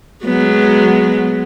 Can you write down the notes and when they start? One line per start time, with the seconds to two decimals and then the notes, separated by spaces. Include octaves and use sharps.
0.25 F#3 G#3 B3